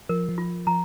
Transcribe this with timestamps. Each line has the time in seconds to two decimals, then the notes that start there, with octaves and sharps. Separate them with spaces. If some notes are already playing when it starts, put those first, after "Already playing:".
0.09 F3 A#4
0.29 F3
0.38 F4
0.67 F3 A#5